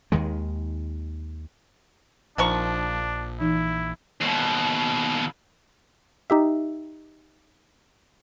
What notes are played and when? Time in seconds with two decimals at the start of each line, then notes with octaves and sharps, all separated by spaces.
0.12 D#2 D#3 G#3
2.38 A#1 D#3 F3 D4 C#6
3.40 E3 D#4 E4
4.21 D#2 B2
6.30 D#4 G4 E5